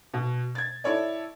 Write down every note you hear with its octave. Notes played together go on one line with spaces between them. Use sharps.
B2
G#6 A6
E4 A4 C#5 D5